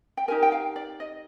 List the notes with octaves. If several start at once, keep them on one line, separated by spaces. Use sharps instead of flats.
G5
D#4 G4 A#4 G#5
G5
F5
D5
D#5